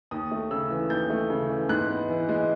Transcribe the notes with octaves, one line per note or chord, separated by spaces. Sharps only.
D#2 D#6
A3
C#3 E6
E3
D#2 G6
A3
C#3
E3
G#2 F#6
B3
E3
G#3